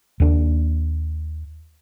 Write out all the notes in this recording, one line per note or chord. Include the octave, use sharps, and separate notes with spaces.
D#2 D4